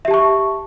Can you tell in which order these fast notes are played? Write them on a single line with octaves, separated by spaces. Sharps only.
E5 G4 A5 C#6